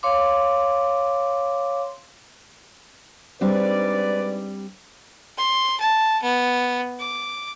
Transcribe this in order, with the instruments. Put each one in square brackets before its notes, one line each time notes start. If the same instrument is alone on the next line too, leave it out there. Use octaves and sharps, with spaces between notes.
[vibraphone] C#5 F5 C6 D6
[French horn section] G#2 B4 D5 [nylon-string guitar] G3 C4 D4
[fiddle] C6
A5
B3
D6